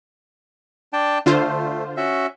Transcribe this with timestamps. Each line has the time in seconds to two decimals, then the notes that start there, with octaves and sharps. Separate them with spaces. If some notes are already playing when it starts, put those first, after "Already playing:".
0.93 D4 G5 A5
1.26 D3 A3 F4 C5
1.97 C#4 F#4 E5